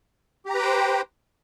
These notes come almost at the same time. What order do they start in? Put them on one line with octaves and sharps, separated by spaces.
G4 A#5 B4 G5 C5